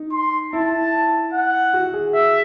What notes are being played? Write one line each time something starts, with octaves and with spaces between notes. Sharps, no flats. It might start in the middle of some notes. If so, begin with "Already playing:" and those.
Already playing: D#4
C6
E4 A5
F#5
F#4
G#4
E5